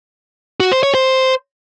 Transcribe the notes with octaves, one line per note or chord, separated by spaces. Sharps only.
F#4
C5
C#5
C5